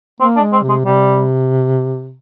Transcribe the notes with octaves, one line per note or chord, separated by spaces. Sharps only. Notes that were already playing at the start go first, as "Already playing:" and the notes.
A#3 C4
D4
G#3
C4
C3
G#3
C3 G3